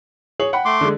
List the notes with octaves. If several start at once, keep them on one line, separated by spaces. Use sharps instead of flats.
G#4 C#5 F#7
F#5 G5 B5
A3 C6 D6
D3 G#3